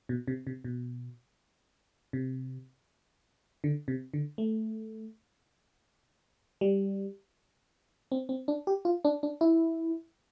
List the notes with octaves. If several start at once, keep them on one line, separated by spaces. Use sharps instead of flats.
B2
C3
C3
B2
C3
D3
C3
D3
A3
G3
C4
C4
D4
G4
F4
D4
D4
E4